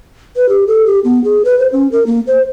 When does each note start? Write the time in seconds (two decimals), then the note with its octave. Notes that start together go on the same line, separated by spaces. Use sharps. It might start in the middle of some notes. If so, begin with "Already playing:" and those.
0.37 B4
0.49 G4
0.67 A4
0.86 G4
1.04 B3
1.24 G#4
1.45 B4
1.59 C5
1.72 C#4
1.92 A#4
2.07 A#3
2.27 C5